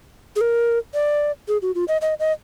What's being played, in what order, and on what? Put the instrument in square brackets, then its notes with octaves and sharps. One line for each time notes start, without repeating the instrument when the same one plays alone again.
[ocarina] G#4
A#4
D5
G#4
F#4
F4
D#5
D#5
D#5